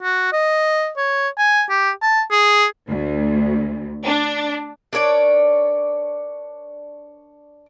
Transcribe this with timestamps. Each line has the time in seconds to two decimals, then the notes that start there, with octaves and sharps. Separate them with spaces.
0.03 F#4
0.32 D#5
0.97 C#5
1.38 G#5
1.70 G4
2.02 A5
2.31 G#4
2.88 D2
4.04 D4
4.93 D4 A#4 C#5 D5